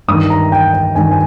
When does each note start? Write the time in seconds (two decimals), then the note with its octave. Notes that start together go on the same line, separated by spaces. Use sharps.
0.08 G2 D#3 D#6
0.30 A#5
0.52 G5
0.74 G5
0.95 G2 D#3 G#5
1.11 G#5